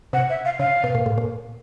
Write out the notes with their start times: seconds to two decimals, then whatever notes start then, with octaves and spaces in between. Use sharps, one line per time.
0.13 C3 F#5
0.30 E5
0.45 F5
0.59 C#3 F5
0.84 B2
0.95 A#2
1.06 A2
1.18 A#2